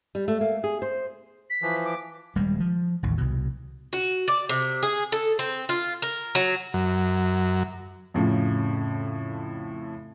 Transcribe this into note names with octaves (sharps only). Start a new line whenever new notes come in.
G3
A3
A#3
G#4
C5
B6
E3 F3
D6
D#1 G3 G#3
F3
A1 D#2
C2 B2
F#4
D5
C3
G#4
A4
C4
F4
A#4
F#3
F#2
F2 A2 C#3 F3